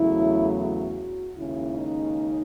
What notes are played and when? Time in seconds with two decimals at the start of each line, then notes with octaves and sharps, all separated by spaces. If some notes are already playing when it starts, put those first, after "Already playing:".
Already playing: E2 C#3 F#3 A3 E4
0.59 F#4
1.37 D#2 C#3 G#3 C#4 E4
1.76 D#4